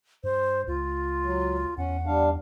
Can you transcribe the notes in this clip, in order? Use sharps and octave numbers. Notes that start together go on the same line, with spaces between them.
G2 C5
C#2 F4
F#3
E2 C#4 F#5
G3 D4 F5